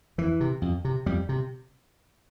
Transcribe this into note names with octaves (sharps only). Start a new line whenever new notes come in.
F2 E3
C3
F2
C3
F2 G3
C3